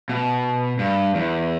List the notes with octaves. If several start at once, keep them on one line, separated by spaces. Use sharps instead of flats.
B2
G2
E2